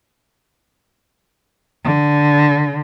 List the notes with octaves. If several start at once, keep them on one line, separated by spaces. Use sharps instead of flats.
D3